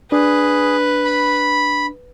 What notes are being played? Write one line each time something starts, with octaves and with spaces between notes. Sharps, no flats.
D4 G#4 B4
B5